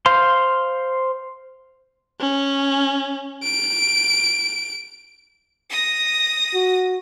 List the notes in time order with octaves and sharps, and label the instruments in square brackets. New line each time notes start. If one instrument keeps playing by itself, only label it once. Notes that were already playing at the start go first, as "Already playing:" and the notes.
[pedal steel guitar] C5 F5 C6
[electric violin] C#4
D7
[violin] D#6 A#6
[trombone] F#4